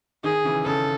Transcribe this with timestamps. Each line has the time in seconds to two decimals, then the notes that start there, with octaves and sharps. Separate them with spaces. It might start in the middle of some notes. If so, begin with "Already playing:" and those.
0.24 D#3 G#4
0.45 C#3 E3
0.66 C#3 A4